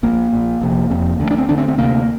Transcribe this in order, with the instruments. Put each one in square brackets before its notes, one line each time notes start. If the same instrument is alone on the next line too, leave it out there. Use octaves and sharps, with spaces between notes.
[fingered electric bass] A#1 A#2 A#3
A#1 A#2
F1 F2 C3
F1 F2 C3
D2 D3
D4
C4
D2 D3 D4
C4
C4
D2 C3 A#3